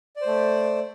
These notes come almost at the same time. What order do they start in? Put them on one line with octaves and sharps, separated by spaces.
D5 C5 A3